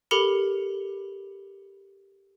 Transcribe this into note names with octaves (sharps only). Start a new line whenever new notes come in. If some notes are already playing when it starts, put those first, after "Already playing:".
G4 A4 A#4 B5 C#7